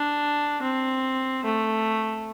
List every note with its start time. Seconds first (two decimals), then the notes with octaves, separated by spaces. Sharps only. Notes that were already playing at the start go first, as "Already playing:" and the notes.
Already playing: D4
0.62 C4
1.44 A3